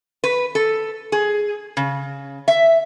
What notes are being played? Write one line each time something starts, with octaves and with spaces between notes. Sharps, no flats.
B4
A4
G#4
C#3
E5